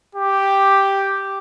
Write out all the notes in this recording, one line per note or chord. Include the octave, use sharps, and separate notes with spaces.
G4